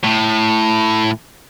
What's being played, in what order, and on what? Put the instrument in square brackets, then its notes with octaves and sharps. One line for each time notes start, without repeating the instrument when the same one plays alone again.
[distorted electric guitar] A2